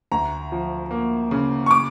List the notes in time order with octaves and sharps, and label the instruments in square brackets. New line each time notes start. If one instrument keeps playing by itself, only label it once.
[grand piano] D2 A#5
F3
A#3
C#3
C#6
D6